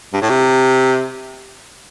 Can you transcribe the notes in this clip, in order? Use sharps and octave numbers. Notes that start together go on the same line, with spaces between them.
G2
A2
C3